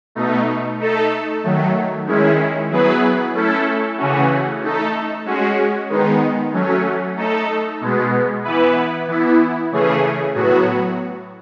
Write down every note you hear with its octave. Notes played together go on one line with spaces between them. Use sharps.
B2 A3 D#4
A3 D#4 A4
D#3 F#3 A3
D#3 G#3 C#4 E4
F#3 B3 E4 G#4 B4
A3 C#4 E4 A4
C#3 E3 A3 C#4 F#4
A3 D#4 A4
G#3 C#4 F#4
D#3 G#3 B3 D#4
F#3 A3 C#4
A3 D#4 A4
B2 G#3 B3
E3 B3 E4 B4
E3 B3 E4
C#3 E3 A3 C#4 G#4
A2 F#3 B3 F#4